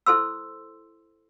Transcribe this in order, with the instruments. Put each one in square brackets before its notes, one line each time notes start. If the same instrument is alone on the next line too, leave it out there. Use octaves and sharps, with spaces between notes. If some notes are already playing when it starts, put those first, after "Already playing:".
[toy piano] E4 A4 C5 C6 E6